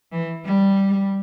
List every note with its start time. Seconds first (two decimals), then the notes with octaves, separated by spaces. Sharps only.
0.12 E3
0.46 G3